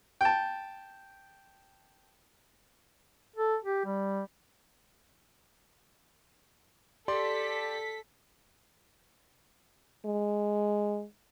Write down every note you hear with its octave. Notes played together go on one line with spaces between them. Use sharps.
G5 A5
A4
G4
G3
G4 A4 D5 C6 B6
G#3